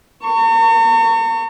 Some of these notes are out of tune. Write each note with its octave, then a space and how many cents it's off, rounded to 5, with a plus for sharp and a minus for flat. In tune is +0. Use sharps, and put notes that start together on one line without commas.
A#5 -45 C#6 +0